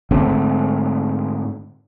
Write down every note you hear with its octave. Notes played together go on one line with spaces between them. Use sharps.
G#2 D3 A3 C4